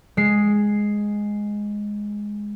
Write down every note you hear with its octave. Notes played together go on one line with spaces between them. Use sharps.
G#3 C7